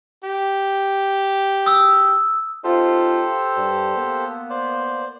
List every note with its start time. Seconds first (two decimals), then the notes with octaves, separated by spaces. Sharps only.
0.24 G4
1.66 D#6 E6
2.64 C4 D#4 F4 G4 A4 C5
3.57 G2
3.96 A#3 B3
4.50 C5 D5